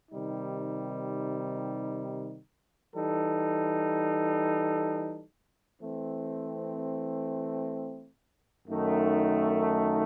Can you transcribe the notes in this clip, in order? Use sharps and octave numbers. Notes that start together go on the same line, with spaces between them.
C3 D#3 G3 D#4
E3 G3 D#4 A4
E3 A3 C4
F#2 D#3 A3 D#4